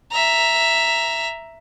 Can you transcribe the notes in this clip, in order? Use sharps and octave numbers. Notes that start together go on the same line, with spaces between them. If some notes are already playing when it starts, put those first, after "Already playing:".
E5 A#5